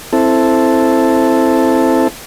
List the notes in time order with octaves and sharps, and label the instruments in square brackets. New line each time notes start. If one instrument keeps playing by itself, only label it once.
[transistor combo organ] C4 E4 A4